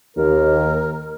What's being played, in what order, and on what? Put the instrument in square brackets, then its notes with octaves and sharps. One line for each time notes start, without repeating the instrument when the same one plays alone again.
[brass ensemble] D#2 [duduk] A#4